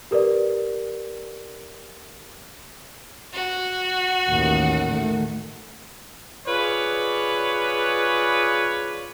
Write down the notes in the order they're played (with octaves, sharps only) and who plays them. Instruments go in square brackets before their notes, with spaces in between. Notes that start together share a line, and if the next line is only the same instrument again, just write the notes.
[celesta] G4 A#4 B4 D5
[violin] F#4
[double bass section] A1 D#2 D#3
D#3 A3
[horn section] F4 G#4 B4 C#5 D5